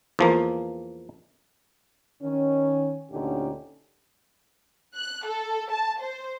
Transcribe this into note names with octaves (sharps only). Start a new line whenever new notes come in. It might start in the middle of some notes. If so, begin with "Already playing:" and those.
E2 F3 A#3
D#3 C#4
D2 A#2 D3 C#4 D#4 G4
F#6
A4
A5
C5